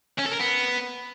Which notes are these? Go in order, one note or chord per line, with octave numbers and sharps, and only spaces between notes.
C#4
A4
A#4
B3